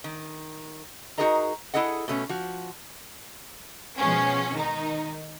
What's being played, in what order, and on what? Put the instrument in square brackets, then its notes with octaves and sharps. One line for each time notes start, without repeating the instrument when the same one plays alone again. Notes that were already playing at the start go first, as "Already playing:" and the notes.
[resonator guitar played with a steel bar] D#3
D#4 F#4 G#4 A#4 D#5 A#5
E4 G#4 A4 D#5 F#5
B2 A3 C#4
F3 F#4
[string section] B2 F3 G#3 C#4
D#3 D#4